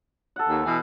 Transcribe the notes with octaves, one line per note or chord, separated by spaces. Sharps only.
A4 F#5
D#2
B2 E3